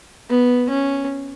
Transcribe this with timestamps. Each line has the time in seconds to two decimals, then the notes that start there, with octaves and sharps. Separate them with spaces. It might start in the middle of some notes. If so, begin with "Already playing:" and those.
0.29 B3
0.70 C#4